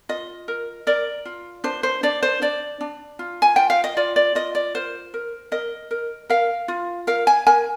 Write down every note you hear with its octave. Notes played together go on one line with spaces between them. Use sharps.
F4 D#5
A#4
A#4 D5
F4
D4 C5
C5
D4 D5
C5
D4 D5
D4
F4
G#5
F4 G5
F5
D#5
F4 D5
D5
F4 D#5
D5
A#4 C5
A#4
A#4 D#5
A#4
A#4 F5
F4
A#4 F5
G#5
A#4 G#5